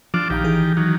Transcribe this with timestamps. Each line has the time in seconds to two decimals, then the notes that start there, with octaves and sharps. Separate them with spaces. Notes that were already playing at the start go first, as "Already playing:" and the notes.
0.14 F3 D4 F4 D6
0.30 A#1 D#3 G4 F5 A#5
0.44 E3 G#4
0.77 D#3 F#3